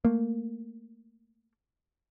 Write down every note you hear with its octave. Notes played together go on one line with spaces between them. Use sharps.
A3 A#3